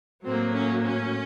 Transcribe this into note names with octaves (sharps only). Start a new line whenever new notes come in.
A2 F#3 A#3 C4
C#4
C#4